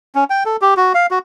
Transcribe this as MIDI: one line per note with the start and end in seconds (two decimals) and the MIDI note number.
0.15 0.24 61
0.30 0.44 79
0.46 0.57 69
0.62 0.74 67
0.77 0.93 66
0.95 1.06 77
1.11 1.19 66